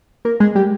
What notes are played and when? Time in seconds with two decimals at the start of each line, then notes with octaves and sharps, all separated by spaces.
0.25 A#3 A#4
0.40 G#3 G#4
0.55 G3 G4